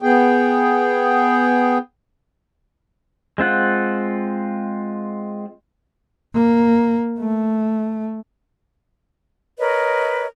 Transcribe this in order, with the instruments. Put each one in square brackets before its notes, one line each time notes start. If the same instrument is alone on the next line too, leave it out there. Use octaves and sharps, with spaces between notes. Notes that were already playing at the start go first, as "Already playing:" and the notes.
[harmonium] B3 G#4 G5
[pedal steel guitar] G#3 C4 F4 F#5
[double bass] A#3
A3
[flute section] A#4 B4 C#5 D#5